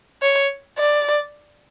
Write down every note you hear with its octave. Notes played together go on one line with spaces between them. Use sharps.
C#5
D5